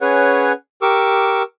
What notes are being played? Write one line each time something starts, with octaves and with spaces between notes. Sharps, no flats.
C#4 G#4 B4 C#5 F#5
G4 A#4 C#6 D6 E6